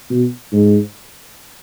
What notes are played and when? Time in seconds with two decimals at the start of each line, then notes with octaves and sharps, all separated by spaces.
0.10 B2
0.52 G#2